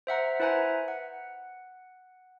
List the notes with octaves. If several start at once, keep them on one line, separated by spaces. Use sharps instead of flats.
C5 E5 F#5 A#5
E4 B4 C5 E5 G#5 A#5
F#5